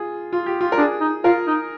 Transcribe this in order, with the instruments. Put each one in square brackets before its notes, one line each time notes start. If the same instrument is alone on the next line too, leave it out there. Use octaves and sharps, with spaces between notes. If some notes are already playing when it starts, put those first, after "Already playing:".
Already playing: [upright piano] F4 G#4
F4
G4
F4
A#4
[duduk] D4 [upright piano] G#4
[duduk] D#4
[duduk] F4 [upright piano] A#4
[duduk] D#4